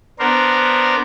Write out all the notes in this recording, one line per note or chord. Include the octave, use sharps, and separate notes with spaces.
B3 D4 A#4 C5